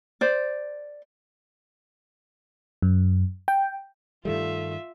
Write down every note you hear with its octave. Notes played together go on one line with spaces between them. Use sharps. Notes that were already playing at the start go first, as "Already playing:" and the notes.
C5 D5
F#2
G5
G2 D#3 G3 A3 F4 E5